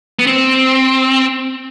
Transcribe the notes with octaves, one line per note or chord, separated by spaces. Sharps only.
B3
C4